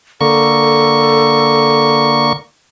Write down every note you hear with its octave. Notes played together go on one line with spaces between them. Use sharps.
D3 A#3 A4 C#6